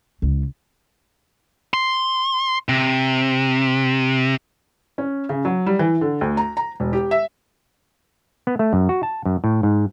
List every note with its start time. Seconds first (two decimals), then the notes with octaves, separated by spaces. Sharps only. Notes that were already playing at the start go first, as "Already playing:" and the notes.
0.22 C#2
1.74 C6
2.69 C3
4.98 C#4
5.29 C#3
5.45 F#3
5.66 G3
5.79 E3
6.01 D3
6.21 D2
6.37 A#5
6.57 A#5
6.80 E1
6.93 G4
7.11 E5
8.47 B3
8.59 A3
8.73 F#2
8.89 F#4
9.03 A5
9.25 F#2
9.44 A2
9.63 G#2